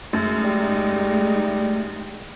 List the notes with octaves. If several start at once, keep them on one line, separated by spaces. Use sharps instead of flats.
F#2 G#3 A3 D#4
G3